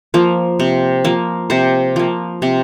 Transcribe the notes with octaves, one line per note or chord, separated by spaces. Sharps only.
F3 A#3
C3
F3 A#3
C3 C5
F3 A#3
C3